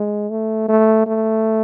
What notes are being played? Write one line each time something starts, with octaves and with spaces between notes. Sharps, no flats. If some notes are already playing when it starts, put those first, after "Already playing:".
Already playing: G#3
A3
A3
A3